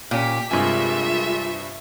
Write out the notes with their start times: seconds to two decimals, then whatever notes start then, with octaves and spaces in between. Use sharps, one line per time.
0.11 A#2 C#4 G4 B6
0.51 G2 C3 G#3 A#3 F4 E5 G#5